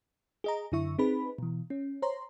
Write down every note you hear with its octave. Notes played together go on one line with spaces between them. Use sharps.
G#4 D#5 A#5
F#2 D3 E4 E5 C#6
C4 D#4 G#4 B4 B5
B2 E3
C#4
C5 C#5 A#5 C6